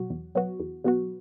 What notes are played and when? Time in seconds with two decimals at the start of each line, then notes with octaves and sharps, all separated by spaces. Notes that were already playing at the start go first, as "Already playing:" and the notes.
Already playing: B2 F#3 F#4
0.10 E2
0.35 B2 F#3 B3 F#4
0.60 E2
0.84 B2 F#3 B3 F#4